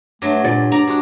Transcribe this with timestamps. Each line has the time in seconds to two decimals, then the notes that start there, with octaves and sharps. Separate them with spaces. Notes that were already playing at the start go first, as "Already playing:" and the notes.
0.22 G2 F#3 A3
0.44 A#2 D5
0.72 D4 D5 A#5
0.87 G#3 D4 F#4